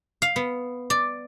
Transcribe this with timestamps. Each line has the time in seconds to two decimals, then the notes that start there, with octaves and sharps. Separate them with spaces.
0.22 F5
0.36 B3
0.90 D5